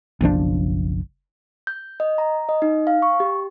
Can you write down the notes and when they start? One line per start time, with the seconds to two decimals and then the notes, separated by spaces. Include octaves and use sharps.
0.21 F#1 B1 F3 D4
1.67 G6
2.00 D#5
2.18 A#5
2.49 D#5
2.62 D#4
2.87 F5
3.02 C#6
3.20 G4